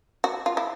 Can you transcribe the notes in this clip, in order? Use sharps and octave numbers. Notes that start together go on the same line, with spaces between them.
F#4
F4
E4